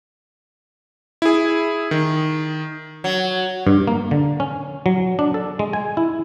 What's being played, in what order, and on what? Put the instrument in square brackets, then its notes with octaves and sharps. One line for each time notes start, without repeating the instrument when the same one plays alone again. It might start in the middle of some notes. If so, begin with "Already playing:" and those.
[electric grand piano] E4 G#4
D#3
[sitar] F#3
[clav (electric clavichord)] G2
A#3
D3
C#4
F#3
D4
A4
G#3
G#5
E4